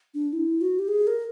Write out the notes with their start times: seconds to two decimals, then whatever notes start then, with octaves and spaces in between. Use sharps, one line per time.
0.14 D4
0.33 E4
0.61 F#4
0.79 G4
0.88 G#4
1.07 A#4